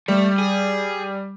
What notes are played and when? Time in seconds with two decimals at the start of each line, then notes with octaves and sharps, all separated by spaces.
0.08 G3 A3
0.38 G#4